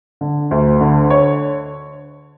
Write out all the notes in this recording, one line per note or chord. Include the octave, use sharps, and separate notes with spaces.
D3
D2
D3
C#5